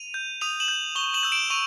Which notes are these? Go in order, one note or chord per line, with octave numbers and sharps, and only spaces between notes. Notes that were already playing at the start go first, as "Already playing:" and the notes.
Already playing: D#7 F7
G6
D#6 D#7 F7
E7 F#7
G6
C#6 F7 G7
E7 F#7
E6 G6
D7 E7
C#6 D#7 F7